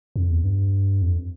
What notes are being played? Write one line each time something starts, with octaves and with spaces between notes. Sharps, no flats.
F2
E2
G2
F2